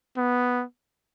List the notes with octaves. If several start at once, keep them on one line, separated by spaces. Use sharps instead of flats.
B3